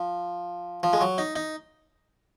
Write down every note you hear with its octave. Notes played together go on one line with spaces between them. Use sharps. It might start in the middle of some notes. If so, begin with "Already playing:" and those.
Already playing: F3
F3
G#3
F#3
D#4
D#4